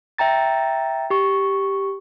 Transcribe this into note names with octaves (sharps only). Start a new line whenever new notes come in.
E5 G5 A#5 A6
G4 C#6